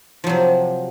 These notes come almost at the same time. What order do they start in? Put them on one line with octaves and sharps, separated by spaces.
F3 F#3 C3